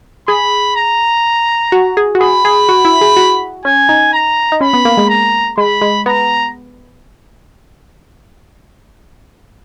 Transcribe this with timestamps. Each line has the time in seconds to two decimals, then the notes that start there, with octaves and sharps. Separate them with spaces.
0.28 G#4 B5
0.76 A#5
1.72 F#4
1.97 G#4
2.15 F#4
2.21 G#4 B5
2.45 G#4
2.69 F#4
2.85 E4
3.01 G#4
3.17 F#4
3.65 C#4 G#5
3.89 D#4
4.13 A#5
4.52 D#4
4.61 C#4 B5
4.73 B3
4.85 A#3
4.97 G#3
5.09 A#5
5.57 G#3 B5
5.81 G#3
6.06 B3 A#5